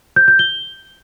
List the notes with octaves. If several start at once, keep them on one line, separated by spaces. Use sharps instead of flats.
G6
G6
G7